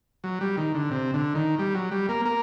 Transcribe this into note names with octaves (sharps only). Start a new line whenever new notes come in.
F#3
G3
D#3
D3
C3
D3
D#3
G3
F#3
G3
A#3
A#3